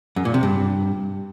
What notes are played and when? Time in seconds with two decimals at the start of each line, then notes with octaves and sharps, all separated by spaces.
0.16 F#2
0.25 A#2
0.34 C3
0.43 G2